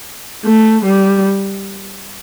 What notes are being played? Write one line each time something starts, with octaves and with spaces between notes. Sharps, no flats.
A3
G3